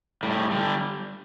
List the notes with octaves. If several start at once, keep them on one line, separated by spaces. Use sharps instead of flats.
A2 G3
D3 G3